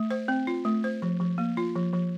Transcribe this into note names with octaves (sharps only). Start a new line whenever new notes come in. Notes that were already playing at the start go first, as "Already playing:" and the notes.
Already playing: A3
C5
C4
F4
A3
C5
F3
F3
A#3
F4
F3
F3